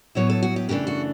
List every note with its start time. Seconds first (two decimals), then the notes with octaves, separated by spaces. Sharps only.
0.15 A2 F#3 B3 E4 C#5
0.30 A4
0.43 F#4
0.56 G4
0.69 F#2 C#3 E3 A3 D4 G4
0.87 F#4